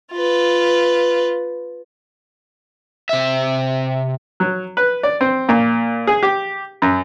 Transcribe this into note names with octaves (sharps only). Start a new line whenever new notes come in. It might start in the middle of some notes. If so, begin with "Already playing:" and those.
F4 B4
C3 E5
F#3
B4
D5
C4
A#2
G#4
G4
F#2